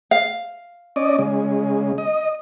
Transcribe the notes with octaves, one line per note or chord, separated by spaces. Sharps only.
F5
C#4 D5 D#5
C#3 G#3
D#5